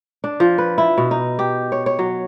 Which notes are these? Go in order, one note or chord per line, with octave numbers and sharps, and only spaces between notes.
D4
F3
B4
E4
B2
D#4
G4
C#5
C#5
F#3